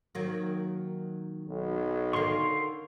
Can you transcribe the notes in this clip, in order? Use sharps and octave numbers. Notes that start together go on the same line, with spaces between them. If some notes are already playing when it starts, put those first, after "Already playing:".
D#3 F#3 A#3
B1
D3 D#3 F5 C6 C#6